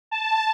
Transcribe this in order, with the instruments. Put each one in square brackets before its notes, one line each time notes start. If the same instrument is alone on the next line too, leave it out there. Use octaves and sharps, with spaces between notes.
[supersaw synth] A5